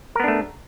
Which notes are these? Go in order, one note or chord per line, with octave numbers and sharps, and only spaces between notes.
A3 B3 D4 A#4